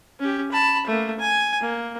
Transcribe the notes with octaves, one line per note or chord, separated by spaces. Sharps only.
C#4 G4
A5 B5
A3 A#3
G#5
A#3